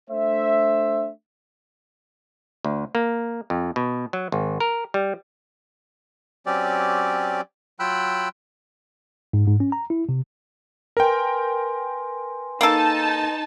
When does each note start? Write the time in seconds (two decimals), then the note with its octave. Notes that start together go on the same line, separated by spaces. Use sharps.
0.10 A3 D4 C5 E5
2.65 D2
2.95 A#3
3.50 F2
3.76 B2
4.13 F#3
4.32 G#1
4.60 A#4
4.94 G3
6.46 F#3 C4 C#4 G4 D5
7.80 F#3 F4 G5 B5 E6 F#6
9.33 G#2
9.47 G#2
9.60 C#4
9.72 A#5
9.90 E4
10.09 C3
10.97 A#4 B4 G5 G#5 C6
12.61 A#3 D#4 A4 A5